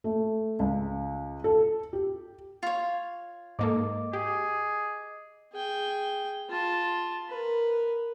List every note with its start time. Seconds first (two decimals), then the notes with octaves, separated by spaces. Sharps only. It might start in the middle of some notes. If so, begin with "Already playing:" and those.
0.04 A3
0.59 C#2
1.44 A4
1.93 G4
2.63 F4 C#5
3.59 G#2 A#3 A4 D#5 D6
4.13 G4 G#4
5.53 G#4 G5
6.50 F4 A5
7.29 A#4 B4